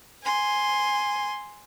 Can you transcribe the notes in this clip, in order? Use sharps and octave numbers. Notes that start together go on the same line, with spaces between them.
G#5 C6